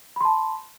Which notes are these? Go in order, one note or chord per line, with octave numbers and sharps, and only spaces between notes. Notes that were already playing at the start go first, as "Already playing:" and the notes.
A5 B5 C6